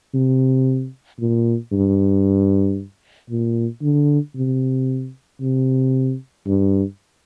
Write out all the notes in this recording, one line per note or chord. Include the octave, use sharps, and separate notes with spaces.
C3
A#2
G2
A#2
D3
C3
C3
G2